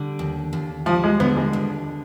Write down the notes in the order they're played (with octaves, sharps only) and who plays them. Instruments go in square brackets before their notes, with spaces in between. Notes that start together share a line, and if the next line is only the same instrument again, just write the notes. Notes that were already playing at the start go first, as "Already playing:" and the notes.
Already playing: [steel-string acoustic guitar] D3 G3
D#2
D#2
[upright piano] F3 [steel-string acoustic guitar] G3
[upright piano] G#3
[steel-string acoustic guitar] D3 [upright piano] B3
[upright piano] G#3
[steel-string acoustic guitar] D#2